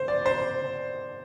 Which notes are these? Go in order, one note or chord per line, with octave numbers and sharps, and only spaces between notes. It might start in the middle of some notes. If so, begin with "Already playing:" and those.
Already playing: C5
D5
C5